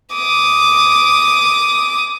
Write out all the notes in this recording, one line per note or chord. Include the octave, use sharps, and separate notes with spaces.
D6 D#6